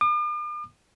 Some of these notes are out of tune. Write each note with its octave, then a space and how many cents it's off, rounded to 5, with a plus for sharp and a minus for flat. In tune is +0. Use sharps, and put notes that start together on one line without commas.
D6 +45